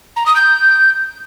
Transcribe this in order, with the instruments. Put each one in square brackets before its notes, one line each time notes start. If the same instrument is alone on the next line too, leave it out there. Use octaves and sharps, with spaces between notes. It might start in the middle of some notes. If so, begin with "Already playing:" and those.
[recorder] A#5
D#6
G6